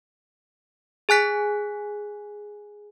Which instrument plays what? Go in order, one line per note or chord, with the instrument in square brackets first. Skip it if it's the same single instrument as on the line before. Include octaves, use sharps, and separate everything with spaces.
[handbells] G#4 G#5 F#6 B6